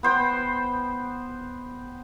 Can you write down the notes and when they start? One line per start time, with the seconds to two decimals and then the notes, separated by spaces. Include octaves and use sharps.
0.03 B3 C5 G5